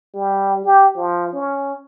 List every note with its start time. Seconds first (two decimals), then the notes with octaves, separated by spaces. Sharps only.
0.14 G3
0.65 G4
0.97 F3
1.33 C#4